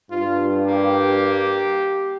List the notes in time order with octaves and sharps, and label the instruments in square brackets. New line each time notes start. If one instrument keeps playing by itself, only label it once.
[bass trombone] G2 [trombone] F4
[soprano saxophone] A#3 [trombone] G4